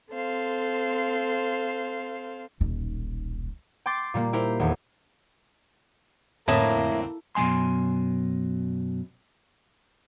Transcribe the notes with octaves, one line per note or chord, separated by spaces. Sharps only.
C4 A4 C5 F5
D#1 B1
G5 C6 D6 A6
A#2 G3 A#3
E4 G4 A#4 C5
D#1 E2
F2 A2 D3 A#3 C4 E4 A5 D#6
F#2 B2 A3 G#5 C6